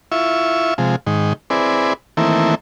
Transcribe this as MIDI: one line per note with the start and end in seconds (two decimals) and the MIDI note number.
0.12 0.74 64
0.12 0.74 65
0.12 0.74 76
0.12 0.74 85
0.78 0.96 48
0.78 0.96 53
0.78 0.96 56
1.07 1.33 44
1.07 1.33 51
1.50 1.93 60
1.50 1.93 64
1.50 1.93 68
1.50 1.93 71
1.50 1.93 74
2.17 2.55 51
2.17 2.55 52
2.17 2.55 57
2.17 2.55 58
2.17 2.55 60
2.17 2.55 64